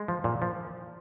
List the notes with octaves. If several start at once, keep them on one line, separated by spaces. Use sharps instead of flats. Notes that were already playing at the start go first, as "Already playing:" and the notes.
Already playing: G#3
F3
A#2
F3